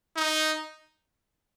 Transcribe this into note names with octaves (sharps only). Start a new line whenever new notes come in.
D#4